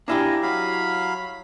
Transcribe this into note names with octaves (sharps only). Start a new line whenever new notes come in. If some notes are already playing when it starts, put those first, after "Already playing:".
D4 E4 G4 F5 G#5 A#5
F#3 F5 B5